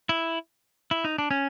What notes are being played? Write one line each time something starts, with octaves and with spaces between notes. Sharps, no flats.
E4
E4
D#4
D4
C#4